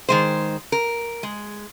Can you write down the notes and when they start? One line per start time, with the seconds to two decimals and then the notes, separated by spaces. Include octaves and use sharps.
0.09 D#3 G#3 C5
0.72 A#4
1.23 G#3